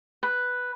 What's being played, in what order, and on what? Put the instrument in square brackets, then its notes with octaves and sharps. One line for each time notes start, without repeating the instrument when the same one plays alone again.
[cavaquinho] B4